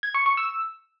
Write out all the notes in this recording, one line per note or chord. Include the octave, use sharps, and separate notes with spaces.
G#6
C#6
C#6
E6